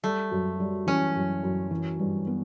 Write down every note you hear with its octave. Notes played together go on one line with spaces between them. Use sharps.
G3 A3
F#2
G3
E3 C#4
F#2
F#2
E3
G2
B3